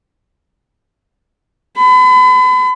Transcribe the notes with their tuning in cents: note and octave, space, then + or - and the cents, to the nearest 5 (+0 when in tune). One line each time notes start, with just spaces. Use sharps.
B5 +40